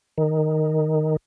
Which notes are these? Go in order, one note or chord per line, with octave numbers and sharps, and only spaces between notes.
D#3